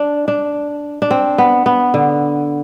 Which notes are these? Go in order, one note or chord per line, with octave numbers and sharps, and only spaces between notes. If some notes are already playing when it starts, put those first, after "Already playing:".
Already playing: D4
D4
D4
C4
B3
B3
D3